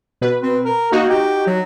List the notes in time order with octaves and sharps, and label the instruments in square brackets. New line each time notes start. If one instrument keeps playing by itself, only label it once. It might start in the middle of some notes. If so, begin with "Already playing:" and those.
[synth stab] B2 B4
[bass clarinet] C4
A#4
[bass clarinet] A#3 [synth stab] D#4 F#4
[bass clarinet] G4
F#3